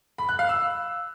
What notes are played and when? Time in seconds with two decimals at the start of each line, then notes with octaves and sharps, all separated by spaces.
0.18 B5
0.29 F#6
0.39 F5
0.49 E6